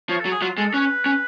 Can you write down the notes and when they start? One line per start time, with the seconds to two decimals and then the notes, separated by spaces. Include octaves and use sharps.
0.09 F3 C#5
0.20 A4
0.25 F#3
0.32 G#4
0.42 F#3 F4
0.58 G#3 A4
0.69 A4
0.74 C#4 B4
1.06 C#4